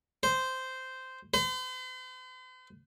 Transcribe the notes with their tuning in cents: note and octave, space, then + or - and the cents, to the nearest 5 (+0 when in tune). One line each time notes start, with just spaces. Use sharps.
C5 -10
C5 -45